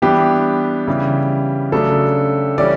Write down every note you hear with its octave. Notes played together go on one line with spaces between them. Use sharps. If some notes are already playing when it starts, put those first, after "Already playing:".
E3 G3 B3 D4 G4
C#3 E3 G3
C#3 F#3 A3 D4 A4
E3 G3 C#4 D5